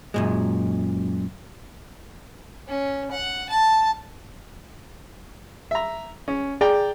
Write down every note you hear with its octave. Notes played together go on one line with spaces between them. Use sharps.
F#2 A#2 G#3
C#4
F#5
A5
E5 A#5
C#4
G#4 D5 G5 A#5